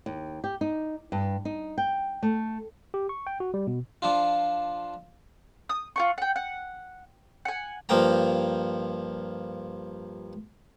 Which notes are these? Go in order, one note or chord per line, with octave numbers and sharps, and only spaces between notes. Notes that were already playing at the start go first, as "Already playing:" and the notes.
D#2
G4
D#4
G2
D#4
G5
A3
G4
C#6
G5
F#4
G3
B2
F3 D4 F4
D#6
F4 F#5 C#6
F#5 G5
F#5
F#5 G#5
G2 F3 A#3 G5 A#5